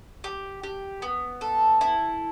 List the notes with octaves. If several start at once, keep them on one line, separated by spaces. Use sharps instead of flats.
G4
G4
B3
A4
E4